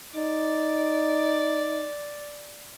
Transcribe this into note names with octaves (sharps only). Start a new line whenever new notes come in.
D#4 D5